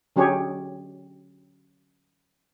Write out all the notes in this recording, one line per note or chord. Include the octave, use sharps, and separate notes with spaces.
D3 F#3 C#4 G4 G#4 C#5